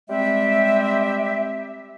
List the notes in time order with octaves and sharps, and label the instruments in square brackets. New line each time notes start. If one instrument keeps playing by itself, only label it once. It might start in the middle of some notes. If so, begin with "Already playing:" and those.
[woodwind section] G3 G#3 C4 G4 E5